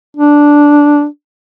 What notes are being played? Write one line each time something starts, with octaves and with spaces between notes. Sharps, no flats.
D4